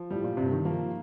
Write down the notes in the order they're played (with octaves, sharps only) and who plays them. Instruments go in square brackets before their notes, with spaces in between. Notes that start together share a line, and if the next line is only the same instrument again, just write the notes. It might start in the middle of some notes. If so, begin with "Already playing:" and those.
Already playing: [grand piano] F3
[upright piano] A2 [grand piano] G3
[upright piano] A#2
[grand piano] G2 [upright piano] C3
[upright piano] D#3
[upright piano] F3 [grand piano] A#3